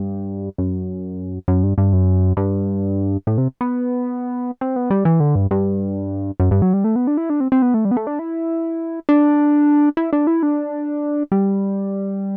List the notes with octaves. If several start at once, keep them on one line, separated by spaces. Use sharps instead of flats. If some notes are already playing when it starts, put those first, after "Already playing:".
Already playing: G2
F#2
F#2
G2
G2
F#2
G2
A2
C3
B3
C4
B3
G3
E3
D3
G2
G2
F#2
G2
F#3
G3
A3
B3
D4
E4
D4
C4
C4
B3
A3
G3
B3
A3
D4
E4
D4
E4
D4
E4
D4
G3